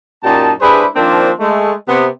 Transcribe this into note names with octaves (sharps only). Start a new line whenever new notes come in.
F#2 A#2 D#4 G4 A5
G3 D4 E4 G#4 B4 C5
D#3 F3 A#3 C4 D4
G#3 A3
C3 B3